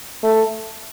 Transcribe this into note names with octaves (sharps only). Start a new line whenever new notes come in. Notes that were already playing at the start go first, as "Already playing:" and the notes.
A3